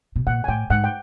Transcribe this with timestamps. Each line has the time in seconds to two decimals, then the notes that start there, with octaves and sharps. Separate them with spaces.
0.16 B2
0.27 A#2 F#5
0.44 G#5
0.48 A2 G5
0.70 G#2 F#5
0.84 G5